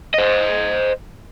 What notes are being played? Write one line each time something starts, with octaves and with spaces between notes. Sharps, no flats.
C5 D#5